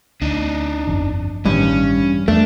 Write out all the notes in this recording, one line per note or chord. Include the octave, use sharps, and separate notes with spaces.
D2 D4 D#4
G1 F2
A1 G2 D#3 C#4
E2 A3 D4